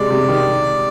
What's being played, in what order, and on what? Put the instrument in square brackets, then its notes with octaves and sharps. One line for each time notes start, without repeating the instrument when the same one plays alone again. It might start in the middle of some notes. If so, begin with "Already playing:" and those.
Already playing: [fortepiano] C3 G#3 [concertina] D5
[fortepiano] C3
D#3